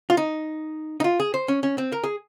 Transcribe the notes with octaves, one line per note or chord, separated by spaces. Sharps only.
F4
D#4
D#4
F4
G#4
C5
C#4
C#4
C4
A#4
G#4